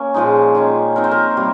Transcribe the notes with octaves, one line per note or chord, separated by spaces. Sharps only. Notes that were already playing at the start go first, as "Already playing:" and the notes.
Already playing: A#3 C#4
A#2 F3 G#3 D#4
D#3 A#3 C#4
F3 C4 D#4 A#4
C5
A#4
C3 G3 A#3